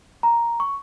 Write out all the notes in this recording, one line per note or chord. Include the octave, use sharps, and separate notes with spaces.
A#5
C#6